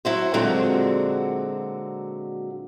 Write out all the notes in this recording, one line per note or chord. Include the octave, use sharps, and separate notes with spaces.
F#3 E4 F#4 C5
A#2 D3 F#3 G#3 C4 F#4